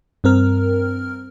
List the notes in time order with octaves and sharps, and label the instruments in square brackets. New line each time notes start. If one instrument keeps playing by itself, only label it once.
[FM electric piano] G2 C4 A#4 F6